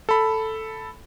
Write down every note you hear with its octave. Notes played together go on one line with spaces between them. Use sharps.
A4 B5